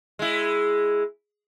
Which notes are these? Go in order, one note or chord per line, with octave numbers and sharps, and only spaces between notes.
G#3 E4